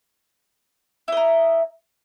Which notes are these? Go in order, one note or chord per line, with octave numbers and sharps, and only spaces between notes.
E4 A#4 D#5